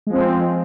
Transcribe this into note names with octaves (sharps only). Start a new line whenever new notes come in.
F3 G#3 C4